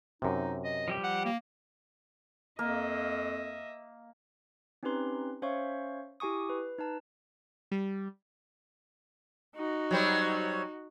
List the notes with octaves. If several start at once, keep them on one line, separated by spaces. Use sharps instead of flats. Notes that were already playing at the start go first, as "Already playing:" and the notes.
F#2 C3 D#4
D#5
F3 G3 G4
F#5
A#3
F2 A#3 D#5 E5
C4 C#4 D#4 G4 B4 C6
C#4 C5 C#5 E5 F5 C#6
E4 G4 G#5 C#6 D#6
B4
D#4 B4 A5
G3
D#4 F#4
F#3 G3 C5